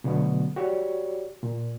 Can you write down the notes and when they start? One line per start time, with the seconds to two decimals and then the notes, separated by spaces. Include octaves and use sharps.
0.04 B2 D3 F#3 A3 B3
0.56 F#4 G4 C#5 D5
1.43 A#2